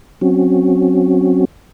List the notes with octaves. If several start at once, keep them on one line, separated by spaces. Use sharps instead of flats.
F#3 C4 C#4 F#4